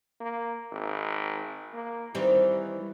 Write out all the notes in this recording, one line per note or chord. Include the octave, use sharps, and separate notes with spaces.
A#3
G#1
A#3
D#3 E3 G3 C4